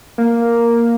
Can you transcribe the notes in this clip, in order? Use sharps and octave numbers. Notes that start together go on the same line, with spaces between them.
A#3